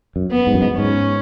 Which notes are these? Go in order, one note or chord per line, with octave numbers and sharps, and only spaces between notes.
F#2
B3
G#2
F#2
G#2
G#2 C#4